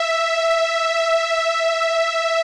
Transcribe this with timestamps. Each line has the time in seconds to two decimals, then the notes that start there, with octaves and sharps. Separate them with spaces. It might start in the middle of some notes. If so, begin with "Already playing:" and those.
Already playing: E5
0.96 E5
1.37 E5